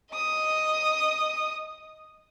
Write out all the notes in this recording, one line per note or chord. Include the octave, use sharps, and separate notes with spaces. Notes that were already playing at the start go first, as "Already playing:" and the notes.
D#5 D#6